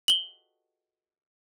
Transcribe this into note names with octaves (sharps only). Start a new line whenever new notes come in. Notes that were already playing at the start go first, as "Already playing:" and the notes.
F#7 G7